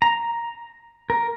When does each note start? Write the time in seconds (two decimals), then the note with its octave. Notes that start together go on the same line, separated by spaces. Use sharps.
0.02 A#5
1.10 A#4